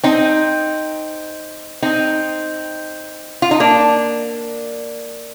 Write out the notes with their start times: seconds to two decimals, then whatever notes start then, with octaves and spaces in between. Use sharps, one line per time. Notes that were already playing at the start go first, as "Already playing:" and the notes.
0.04 C4 D#4
1.82 C4 D#4
3.42 F4
3.51 D#4
3.60 A#3 D4